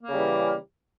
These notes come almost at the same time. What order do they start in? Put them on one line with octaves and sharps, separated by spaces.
A#3 C#3 G3 E3